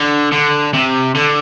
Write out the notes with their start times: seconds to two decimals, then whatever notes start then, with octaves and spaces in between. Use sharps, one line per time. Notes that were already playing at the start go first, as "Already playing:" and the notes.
Already playing: D3
0.32 D3
0.74 C3
1.15 D3